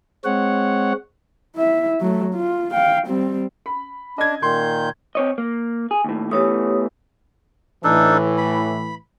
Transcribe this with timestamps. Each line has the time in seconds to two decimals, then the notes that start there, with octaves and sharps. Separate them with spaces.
0.25 G#3 C4 C#5 F#5
1.56 E4 E5
2.00 F#3 A3
2.35 F4
2.72 F5 G5
3.07 G3 C4
3.66 B5
4.18 D4 D#5 G#6
4.42 A#2 D#3 C6 G6
5.15 C4 C#5 D#5
5.38 A#3
5.91 G#4
6.04 D#2 A2
6.31 E2 E3 A3 G4 C#5 D#6
7.84 A2 E3 D4 D#4 A4
8.38 B5